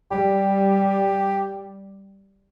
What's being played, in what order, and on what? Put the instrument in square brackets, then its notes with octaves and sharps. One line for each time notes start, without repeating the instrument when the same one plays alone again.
[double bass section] G3 [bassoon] G4